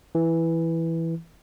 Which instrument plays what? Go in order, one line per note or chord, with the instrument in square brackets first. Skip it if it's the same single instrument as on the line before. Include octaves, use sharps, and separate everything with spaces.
[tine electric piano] E3